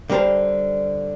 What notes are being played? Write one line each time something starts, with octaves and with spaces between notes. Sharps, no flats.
D3 G3 A#4 C5 A5